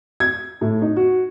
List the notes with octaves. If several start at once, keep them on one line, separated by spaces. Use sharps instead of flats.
G#6
A2
D#4
F#4